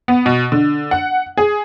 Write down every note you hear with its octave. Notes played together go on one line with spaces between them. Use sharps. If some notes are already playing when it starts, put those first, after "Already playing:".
B3
B2
D3
F#5
G#4